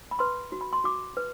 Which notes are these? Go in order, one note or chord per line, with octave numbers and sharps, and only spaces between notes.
B5
B4 C6
F#4
B5
C6
F#4 D6
B4